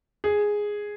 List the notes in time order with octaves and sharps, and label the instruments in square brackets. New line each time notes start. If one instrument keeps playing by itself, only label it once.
[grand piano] G#4